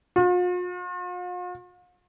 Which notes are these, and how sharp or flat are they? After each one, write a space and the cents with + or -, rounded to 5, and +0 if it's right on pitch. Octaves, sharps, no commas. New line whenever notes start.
F4 +45